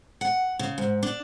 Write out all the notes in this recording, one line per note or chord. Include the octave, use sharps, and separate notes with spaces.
F#5
C#3
G#2
D4